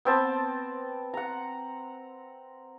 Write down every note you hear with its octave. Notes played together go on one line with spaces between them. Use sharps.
B3 C4 A5
F#5 A#5